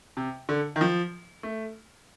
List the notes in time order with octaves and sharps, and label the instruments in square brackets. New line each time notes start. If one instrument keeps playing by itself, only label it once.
[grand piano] C3
D3
D#3
F3
A3